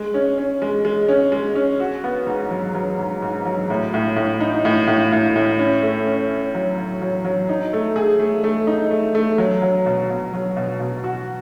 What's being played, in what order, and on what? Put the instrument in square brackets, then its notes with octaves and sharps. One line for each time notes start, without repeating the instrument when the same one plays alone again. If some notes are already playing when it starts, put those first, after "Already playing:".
Already playing: [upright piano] G#3
C#4
C#4
G#3
G#3
C#4
G#3
C#4
F#4
B3
G#2
F#3
F#3
G#2
G#2
F#3
A2
A2
A2
D#4
A2
A2
A2
A2
C#4
A3
C#4
C#4
F#3
F#3
F#3
F#3
D#4
A3
G#4
A3
A3
D#4
A3
A3
F#3
F#3
B2
B2
F#3
B2
B2
F#4